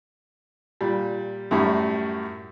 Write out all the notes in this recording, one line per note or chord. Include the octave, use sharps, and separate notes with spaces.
A#2 G3
F#2 A2 G3